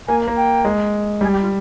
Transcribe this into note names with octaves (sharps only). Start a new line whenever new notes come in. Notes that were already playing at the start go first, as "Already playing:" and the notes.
A#3 G#5
A#3
G5
G#3
G3 G#4
G4
F4